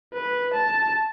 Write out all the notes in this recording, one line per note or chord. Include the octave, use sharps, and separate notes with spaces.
B4
A5